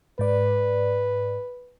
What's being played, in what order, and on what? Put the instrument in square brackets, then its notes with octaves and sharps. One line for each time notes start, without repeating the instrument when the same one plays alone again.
[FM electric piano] G#2 D5 [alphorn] B4